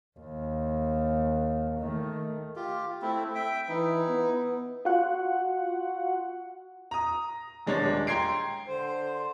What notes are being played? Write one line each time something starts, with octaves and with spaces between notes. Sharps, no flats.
D#2
D#3 A3
F4 G4
A3 C4 E4
E5 G5
E3 D#4 E4
B3
F4 F#4 F#5
A#5 D#6
D#1 G#3 D4 C#5 A6
G5 A#5 C6 G#6 C7 D7
D3 C5